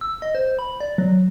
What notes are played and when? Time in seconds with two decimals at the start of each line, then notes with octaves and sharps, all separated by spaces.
0.01 E6
0.22 D#5
0.35 C5
0.59 B5
0.80 D5
0.98 F#3